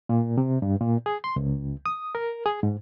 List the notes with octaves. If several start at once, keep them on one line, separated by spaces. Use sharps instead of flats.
A#2
C3
G2
A#2
G#4
C6
C#2
D#6
A#4
G#4
G#2